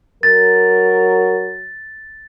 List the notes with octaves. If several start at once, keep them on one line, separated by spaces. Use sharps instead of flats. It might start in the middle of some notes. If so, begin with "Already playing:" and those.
F#3 A#4 A6